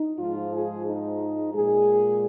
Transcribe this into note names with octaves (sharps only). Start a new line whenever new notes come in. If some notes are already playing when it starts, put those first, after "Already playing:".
Already playing: D#4
G#2 F3 G#3 F4
G#4
D#4
A#2 G#3 G#4